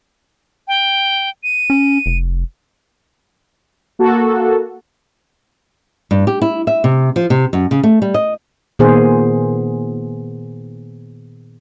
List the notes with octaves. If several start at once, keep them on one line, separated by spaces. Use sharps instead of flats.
G5
D#7
C#4
F1
A#3 F#4 A4
G2
G4
E4
E5
C3
F3
C3
F#2
C#3
A3
G3
D#5
A#2 D#3 B3 G#4 C5